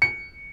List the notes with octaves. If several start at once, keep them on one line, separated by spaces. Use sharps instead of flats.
C#7